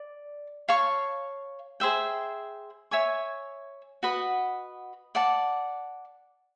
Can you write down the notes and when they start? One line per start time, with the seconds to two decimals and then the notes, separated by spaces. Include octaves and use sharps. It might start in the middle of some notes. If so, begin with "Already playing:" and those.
Already playing: D5
0.69 C#5 F5 A5 C#6
1.80 G#4 C5 E5 G5
2.91 C#5 E5 G#5 C#6
4.03 F#4 B4 D#5 F#5
5.15 D5 F#5 A5